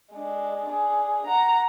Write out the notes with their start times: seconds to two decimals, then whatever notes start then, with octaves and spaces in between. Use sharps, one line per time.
0.12 G#3 D4
0.69 D4 G#4
1.26 F#5 A#5